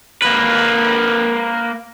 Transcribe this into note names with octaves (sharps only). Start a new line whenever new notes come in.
A#3 B4